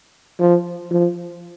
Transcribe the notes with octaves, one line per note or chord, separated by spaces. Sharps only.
F3
F3